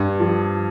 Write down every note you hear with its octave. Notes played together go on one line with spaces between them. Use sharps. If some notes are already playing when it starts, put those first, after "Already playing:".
Already playing: G2
F3